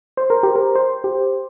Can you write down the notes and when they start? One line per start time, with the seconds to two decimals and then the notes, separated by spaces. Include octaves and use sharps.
0.17 C5
0.30 A#4
0.43 G4
0.56 A#4
0.75 C5
1.04 G4